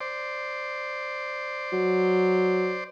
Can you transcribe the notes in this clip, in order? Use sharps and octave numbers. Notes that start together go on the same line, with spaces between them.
C5 D5
F#3